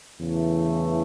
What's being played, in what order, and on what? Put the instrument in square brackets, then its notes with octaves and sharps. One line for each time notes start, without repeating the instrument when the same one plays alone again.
[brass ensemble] E2 C#3 E3 A3